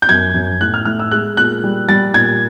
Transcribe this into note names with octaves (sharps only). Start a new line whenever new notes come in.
G6
F#2 G#6
F#2
A2 F#6
F6
A2 F6
E6
G#3 F#6
A#2 F#6
G3
G3 A6
A#2 G#6